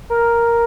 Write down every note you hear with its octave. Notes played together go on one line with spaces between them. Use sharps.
A#4